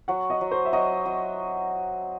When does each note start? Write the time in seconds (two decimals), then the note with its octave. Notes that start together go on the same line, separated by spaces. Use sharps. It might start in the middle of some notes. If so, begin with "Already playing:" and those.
0.08 F#3 F#5
0.30 D#5
0.41 F#3
0.51 C5
0.65 E5
0.73 F#3 D#5
1.06 F#3